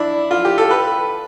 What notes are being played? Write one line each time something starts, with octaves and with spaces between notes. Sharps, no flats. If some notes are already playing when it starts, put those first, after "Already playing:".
Already playing: D4 E4
F4
G4
A4
B4